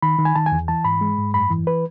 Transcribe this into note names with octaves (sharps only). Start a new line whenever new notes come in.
D#3 B5
D#3
G#5
D#3 A5
G#5
E2
E3 A5
G#2 B5
G#3
G#2
F#2 B5
E3
B4